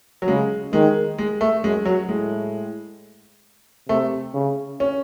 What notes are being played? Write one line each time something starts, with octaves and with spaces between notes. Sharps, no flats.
F#3
C#3 G#3
D#3 G#3
G#3
A3
F#2 G#3
F#3
A2 G#3
C3 A3
C#3
C#4